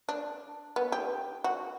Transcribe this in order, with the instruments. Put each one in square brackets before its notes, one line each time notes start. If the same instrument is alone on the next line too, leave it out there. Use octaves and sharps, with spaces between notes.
[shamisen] D4
B3
G4
F#4